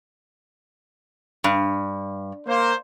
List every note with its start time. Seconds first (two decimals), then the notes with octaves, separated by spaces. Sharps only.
1.44 G2
2.47 A#3 C5